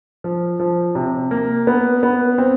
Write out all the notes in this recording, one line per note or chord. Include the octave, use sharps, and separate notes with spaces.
F3
F3
C3
A#3
B3
B3
C4